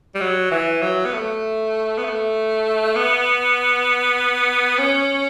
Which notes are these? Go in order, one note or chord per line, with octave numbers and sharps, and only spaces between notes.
G3
F#3
E3
F#3
B3
A3
B3
A3
B3
C#4